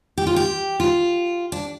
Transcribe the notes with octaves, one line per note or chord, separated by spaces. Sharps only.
G4
F4
G4
F4
D4